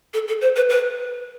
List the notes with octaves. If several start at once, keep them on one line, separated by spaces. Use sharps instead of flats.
A4
A4
C5
B4
B4